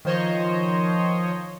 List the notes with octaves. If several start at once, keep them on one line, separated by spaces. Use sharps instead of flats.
D#3 F3 C5 C#5 D#5